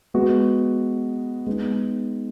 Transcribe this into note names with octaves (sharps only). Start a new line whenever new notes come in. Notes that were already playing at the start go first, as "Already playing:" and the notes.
G#3 B3 F#4
G#3 B3 D#4